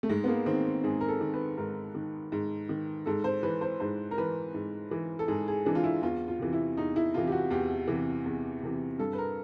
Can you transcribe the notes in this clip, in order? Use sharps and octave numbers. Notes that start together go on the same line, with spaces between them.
A3
G#2 G#3
B3
A#3
D#3 C4
G#2 G#4
A#4
A4
D#3
B4
G#2 A#4
D#3
G#2
D#3
G#2 A4
C5
E3 B4
C5
G#2 C5
A#4
E3 B4
G#2
E3
A4
G#2 G#4
G#4
E3 D4
F4
E4
E2 F4
F4
C3 E3
E4
E2 D#4
E4
C3 E3 F4
G4
F#4
E2 G4
C3 E3
E2
C3 E3
G2 A4
B4
A#4